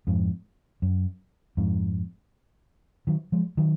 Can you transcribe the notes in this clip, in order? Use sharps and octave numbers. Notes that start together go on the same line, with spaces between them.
F2 G#2
F#2
F2 G#2
D#3 F#3
F3 G#3
D#3 F#3